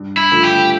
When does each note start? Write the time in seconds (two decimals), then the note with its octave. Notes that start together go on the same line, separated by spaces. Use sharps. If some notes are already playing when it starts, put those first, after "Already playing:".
Already playing: G2
0.17 E4
0.31 D3 F3 A3
0.43 G4